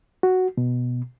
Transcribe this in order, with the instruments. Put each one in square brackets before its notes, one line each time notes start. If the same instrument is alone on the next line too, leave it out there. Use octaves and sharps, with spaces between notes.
[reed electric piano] F#4
B2